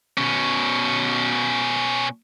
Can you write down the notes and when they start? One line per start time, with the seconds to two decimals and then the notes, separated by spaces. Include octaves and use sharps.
0.18 B2 C#4